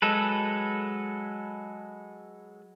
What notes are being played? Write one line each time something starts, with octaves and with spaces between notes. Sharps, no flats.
F#3 G#3 A4 B4